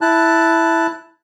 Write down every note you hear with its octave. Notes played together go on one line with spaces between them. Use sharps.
E4 A5 F#6